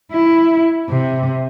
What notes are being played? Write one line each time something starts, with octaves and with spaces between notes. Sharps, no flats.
E4
C3